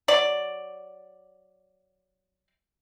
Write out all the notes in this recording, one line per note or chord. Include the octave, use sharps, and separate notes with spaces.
F#3 D5